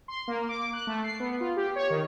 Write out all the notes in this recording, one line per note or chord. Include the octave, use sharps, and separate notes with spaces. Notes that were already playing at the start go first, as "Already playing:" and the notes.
C6
A#3
D6
F#6
A3
C7
B3
F4
G4
C#5
D#3